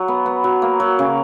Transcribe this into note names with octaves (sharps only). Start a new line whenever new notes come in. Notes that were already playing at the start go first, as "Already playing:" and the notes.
Already playing: F#3
B3
B3
F#3
A#3
F#3
C#3